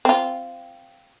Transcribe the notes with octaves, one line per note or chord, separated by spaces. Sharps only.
C4 F4